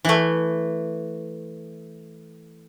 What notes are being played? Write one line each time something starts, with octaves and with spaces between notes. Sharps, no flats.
E3 A3